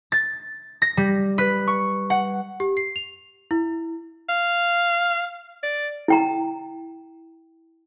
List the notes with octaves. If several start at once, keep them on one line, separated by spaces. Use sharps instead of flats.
A6
A#6
G3
B4
C#6
F#5
G4
C7
F7
E4
F5
D5
E4 G5 A#5